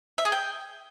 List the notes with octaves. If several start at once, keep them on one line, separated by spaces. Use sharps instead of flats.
E5
G#4
G5